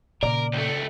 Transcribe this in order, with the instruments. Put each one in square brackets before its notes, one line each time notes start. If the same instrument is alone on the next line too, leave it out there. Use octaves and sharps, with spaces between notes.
[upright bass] A#2 C#3 [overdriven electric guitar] A#4 [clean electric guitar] D5
[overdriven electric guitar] C#2 A3